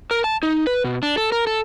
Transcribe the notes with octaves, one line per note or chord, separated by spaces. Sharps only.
A#4
A5
D#4
B4
B2
D4
A4
A#4
A4